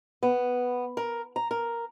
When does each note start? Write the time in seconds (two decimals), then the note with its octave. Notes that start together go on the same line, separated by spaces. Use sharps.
0.23 B3
0.97 A#4
1.36 A#5
1.51 A#4